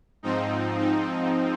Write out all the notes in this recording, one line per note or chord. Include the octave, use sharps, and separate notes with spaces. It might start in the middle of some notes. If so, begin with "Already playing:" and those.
G#2 F3 C4 D#4
D#4